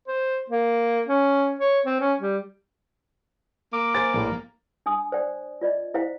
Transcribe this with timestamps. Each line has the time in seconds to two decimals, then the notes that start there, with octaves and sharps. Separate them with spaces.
0.08 C5
0.50 A#3
1.08 C#4
1.59 C#5
1.86 C4
2.00 C#4
2.20 G3
3.73 A#3 D6
3.95 C5 G#5 A6
4.14 A#1 A2
4.86 D4 G#5 D#6
5.12 C5 D5 G5
5.61 F4 D5 D#5
5.94 E4 C5 F5 G5